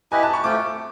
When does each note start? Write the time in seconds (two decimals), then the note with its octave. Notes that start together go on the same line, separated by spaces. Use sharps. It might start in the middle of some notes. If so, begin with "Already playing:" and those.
0.12 E4 G4 B4 D#5 G#5
0.23 A5
0.33 C#6
0.44 A3 C4 F4 D6